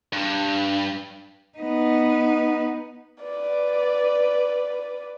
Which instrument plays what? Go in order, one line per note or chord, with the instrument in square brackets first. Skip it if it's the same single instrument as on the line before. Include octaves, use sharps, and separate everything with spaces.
[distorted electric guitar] G2
[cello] B3 D#4
[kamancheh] B4 D5